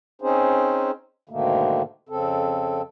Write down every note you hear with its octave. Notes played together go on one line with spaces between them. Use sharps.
C4 C#4 D#4 G#4 C5
G#2 B2 D3 D#3 A3 A#3
F2 C#3 C4 A4